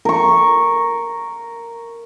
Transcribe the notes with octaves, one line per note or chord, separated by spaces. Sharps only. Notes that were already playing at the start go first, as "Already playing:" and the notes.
A#4 C#6